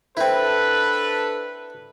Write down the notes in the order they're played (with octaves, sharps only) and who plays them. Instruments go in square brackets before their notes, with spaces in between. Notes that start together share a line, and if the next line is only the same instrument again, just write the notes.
[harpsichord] C4 E4 [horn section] D4 A4 B4